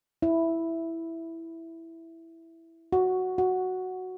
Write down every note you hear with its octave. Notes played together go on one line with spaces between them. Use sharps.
E4
F#4
F#4